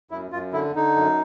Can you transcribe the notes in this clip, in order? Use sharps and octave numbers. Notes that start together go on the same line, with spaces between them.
F#2 E4
F#2 F4
D3 E4
D3 D#4
F#2